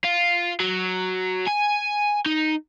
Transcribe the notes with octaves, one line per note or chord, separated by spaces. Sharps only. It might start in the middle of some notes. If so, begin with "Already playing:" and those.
F4
F#3
G#5
D#4